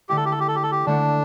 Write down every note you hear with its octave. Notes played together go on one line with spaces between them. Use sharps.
D3 A3 E4 G4
A4
G4
A4
G4
A4
G4
A4
G4
D3 A3 D4 E4